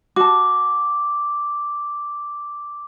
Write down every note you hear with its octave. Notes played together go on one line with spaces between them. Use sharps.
F#4 A5 D6